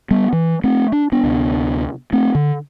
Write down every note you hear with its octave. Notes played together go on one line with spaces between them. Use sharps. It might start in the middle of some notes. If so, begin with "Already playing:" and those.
G3 B3
E3
A3 C4
D4
B3 D4
D2 C3
A3 C4
D3